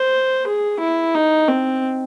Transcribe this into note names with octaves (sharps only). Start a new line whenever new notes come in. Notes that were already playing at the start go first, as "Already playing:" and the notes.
Already playing: C5
G#4
E4
D#4
C4